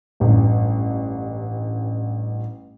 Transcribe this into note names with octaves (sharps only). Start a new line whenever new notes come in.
A1 G2